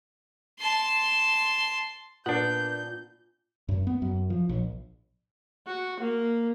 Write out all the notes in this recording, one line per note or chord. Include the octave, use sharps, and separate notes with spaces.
A5 C6
A#2 B3 D4 B4 F#5 G6
F#2
B3
F#2
F3
A#1
F#4
A#3